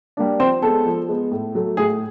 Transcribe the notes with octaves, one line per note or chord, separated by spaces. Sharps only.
G3 A#3 D4
F3 C4 C5
G#3 B3 A4
F3
G#3 B3
A2
F#3 A3
A2 G#4